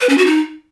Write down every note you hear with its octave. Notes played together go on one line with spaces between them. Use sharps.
B4
C#4
F#4
D#4